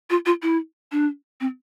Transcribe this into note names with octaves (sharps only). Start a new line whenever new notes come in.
F4
F4
E4
D4
C4